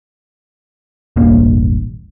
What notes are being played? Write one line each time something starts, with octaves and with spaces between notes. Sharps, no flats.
E1 A1 G2 A#3